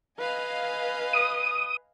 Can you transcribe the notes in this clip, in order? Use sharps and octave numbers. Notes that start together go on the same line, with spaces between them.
B4 D#5 F5 G#5
D#6